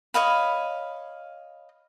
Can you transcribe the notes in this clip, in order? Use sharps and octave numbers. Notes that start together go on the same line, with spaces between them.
C#5 D#5 F5 B5